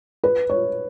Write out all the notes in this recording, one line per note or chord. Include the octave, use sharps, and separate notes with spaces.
B4
C#5